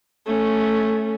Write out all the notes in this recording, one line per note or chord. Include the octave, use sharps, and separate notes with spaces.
A3 C#4